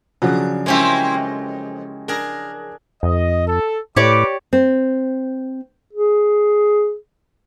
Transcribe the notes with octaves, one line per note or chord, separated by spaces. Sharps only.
C#3 F3 F#3 D4
G#3 A#3 C4 C#4 E4 G4
F2
D4 G#4 A#4
F2 D#5
A4
A2 E4 G4 B4 C#5 D5 D6
C4
G#4